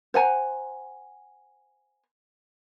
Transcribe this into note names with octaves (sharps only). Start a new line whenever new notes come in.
C5 F#5 G#5 A#5